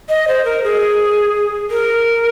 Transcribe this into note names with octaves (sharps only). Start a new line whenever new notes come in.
D#5
C5
A#4
G#4
A#4